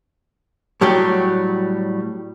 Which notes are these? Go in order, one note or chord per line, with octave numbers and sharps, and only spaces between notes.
A2 F#3 G3 G4